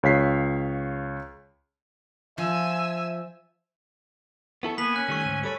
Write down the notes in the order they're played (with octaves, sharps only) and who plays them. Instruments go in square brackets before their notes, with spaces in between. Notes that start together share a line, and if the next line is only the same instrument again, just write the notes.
[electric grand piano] C#2 C#5 F5 B6 C7
[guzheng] F3 [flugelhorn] E5 [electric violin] G#5 E6
[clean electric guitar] B3 E4 A4 [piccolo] C#6
[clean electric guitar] A#3 [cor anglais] B3 [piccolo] G#5 [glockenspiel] B6 F#7
[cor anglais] C#4 [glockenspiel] F#6
[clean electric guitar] D#3 G3 A3 [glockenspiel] C#6 E6
[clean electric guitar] D2 G#2
[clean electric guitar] G3 A4 C#5 [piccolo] B5 [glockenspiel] D#7